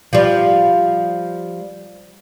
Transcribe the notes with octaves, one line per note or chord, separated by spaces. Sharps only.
F3 G3